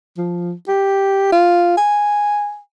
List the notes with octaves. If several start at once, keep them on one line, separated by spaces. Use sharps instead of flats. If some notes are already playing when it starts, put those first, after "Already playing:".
F3
G4
F4
G#5